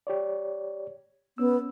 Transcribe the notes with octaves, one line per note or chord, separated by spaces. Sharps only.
G4 C#5 D5
B3 C#4 E6